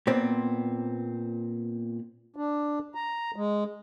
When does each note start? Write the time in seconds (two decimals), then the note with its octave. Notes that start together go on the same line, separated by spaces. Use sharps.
0.07 A#2 B3 C4
2.36 D4
2.95 A#5
3.36 G#3